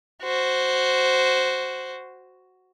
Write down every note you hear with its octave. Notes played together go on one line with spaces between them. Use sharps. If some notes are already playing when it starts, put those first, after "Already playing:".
F#4 C5